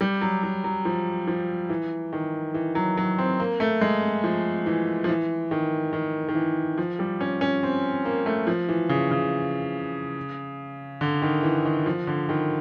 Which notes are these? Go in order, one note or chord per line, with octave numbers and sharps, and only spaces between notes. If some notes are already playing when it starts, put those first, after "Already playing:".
G3
F#3
F#3
F#3
F3
F3
E3
D#3
E3
F#3
F#3
C4
A#3
A3
G#3
F3
E3
F3
E3
D#3
D#3
D#3
E3
F3
G3
C#4
C#4
C4
A#3
A3
F3
E3
C#3
C#3
D3
D#3
E3
D#3
F3
D3
D#3